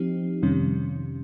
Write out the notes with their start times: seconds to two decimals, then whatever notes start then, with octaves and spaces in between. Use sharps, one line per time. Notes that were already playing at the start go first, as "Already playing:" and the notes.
Already playing: F3 C4 D#4 G4
0.42 F2 C3 D#3 G3 C#4